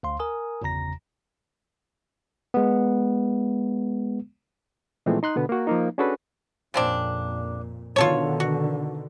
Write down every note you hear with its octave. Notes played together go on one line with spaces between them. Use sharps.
D2 F5 C6
A#4 G#5 D#6
G1 E2 C#3 A#5 A#6
G#3 B3
A#2 E3 F3 G#3 A3 C4
D#4 C6 F#6
B2 D3 B3
A#3 F#4
F3 A#3 D#4
C#4 D4 F#4 G#4 A4 B4
F2 A#2 C#3 C4 D4
B2 D3 D#3 F4 A4 C#5
F#4